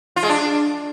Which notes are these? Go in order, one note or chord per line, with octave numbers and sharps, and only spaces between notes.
F4
G#3
D4